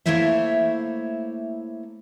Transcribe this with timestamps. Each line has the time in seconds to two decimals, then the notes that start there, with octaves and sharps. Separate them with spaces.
0.06 A3 A#3 E4 C5 C#5 E5